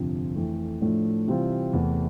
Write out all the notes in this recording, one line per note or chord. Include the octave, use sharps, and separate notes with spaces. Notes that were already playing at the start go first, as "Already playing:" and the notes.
Already playing: G1 F2 C3 F3 C4
F2 E3 A3
A2 F3 A3 D4
C3 E3 G3 C4 F4
E2 C3 E3 A3